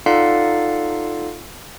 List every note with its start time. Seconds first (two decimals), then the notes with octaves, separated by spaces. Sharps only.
0.06 D#4 F4 A4 D5 F5 F#5